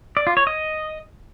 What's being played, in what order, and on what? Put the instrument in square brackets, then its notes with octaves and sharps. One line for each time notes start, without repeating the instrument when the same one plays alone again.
[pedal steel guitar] D5
F4
C#5
D#5